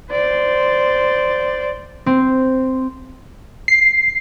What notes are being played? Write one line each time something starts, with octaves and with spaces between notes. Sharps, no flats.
C5 D5
C4
C7